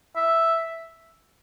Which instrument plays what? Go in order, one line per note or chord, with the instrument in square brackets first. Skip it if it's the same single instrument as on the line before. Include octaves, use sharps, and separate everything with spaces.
[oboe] E5